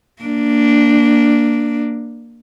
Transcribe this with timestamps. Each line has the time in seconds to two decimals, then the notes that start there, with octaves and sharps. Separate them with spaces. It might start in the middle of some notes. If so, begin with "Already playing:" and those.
0.22 A#3 D4